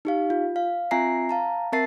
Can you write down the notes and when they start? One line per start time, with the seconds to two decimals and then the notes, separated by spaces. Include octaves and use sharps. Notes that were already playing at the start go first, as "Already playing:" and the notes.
0.05 D#4 G4 F5
0.30 F4
0.56 F5
0.91 C4 F4 E5 G#5 A#5 C7
1.29 F5 A5 A#5
1.73 C4 A#4 E5 A5 A6 C7